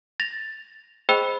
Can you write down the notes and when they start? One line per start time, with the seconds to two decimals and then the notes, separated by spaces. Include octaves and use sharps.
0.20 A6 A#6 F7
1.09 G#4 C5 D#5 G5 B5 E6